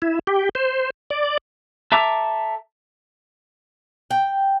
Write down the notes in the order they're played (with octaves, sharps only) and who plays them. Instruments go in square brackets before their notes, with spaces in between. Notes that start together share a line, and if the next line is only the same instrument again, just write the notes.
[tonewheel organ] E4
G4
C5
D5
[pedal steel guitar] A4 E5 A#5 D6
[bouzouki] G5